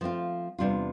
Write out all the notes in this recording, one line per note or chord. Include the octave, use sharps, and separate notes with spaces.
F3 A3 C4 F4
E2 C3 G3 D4 F4